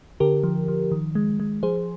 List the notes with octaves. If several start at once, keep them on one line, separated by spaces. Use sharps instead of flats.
D3 G4 A#4
F3
F3
D#3
G#3
G#3
F3 G#4 C5